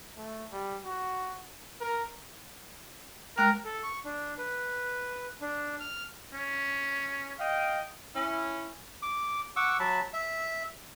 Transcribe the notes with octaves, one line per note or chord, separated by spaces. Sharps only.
A3
G3
F#4
A#4
G#3 A#4 G5
A4
C#6
D4
B4
D4
F6
C#4
D#5 F5 G5
C#4 E4
D6
F#5 C#6 D6 E6
F#3 A5 B5
E5